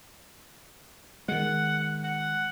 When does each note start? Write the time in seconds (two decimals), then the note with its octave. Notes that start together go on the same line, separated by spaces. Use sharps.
1.28 D#3 G#3 F#5
2.03 F#5